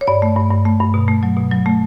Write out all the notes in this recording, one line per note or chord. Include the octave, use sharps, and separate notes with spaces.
C#5
G2 D5
A3
G2
G2
A3
G2
B2
A3
F#3
B2
F#3
A3